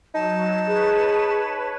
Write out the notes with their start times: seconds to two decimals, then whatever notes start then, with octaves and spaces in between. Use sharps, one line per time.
0.14 F#3 D#4 A5
0.68 G#4 B4 C#5